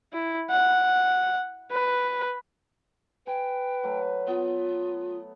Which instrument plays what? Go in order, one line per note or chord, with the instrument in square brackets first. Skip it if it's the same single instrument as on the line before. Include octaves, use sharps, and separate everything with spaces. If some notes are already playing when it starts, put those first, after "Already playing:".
[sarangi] E4
F#5
B4
[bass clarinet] B4 [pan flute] G5 [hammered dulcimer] G#5
[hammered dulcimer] F#3 A3
[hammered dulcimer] B3 [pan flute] F4